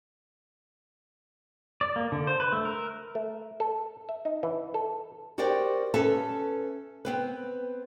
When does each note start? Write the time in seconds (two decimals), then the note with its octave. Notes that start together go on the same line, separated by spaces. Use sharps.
1.81 D5
1.96 A#3
2.12 D3
2.27 C5
2.40 B4
2.52 A3
2.65 A#4
3.15 A3
3.60 A4
4.09 E5
4.25 D#4
4.43 E3
4.74 A4
5.38 F#4 G4 A#4 C5 D5 G5
5.94 C#4 A4 B4 E5 A5
7.05 B3 C4 B4